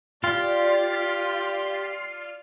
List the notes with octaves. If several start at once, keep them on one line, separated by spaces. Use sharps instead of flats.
G3 F4 G4 D5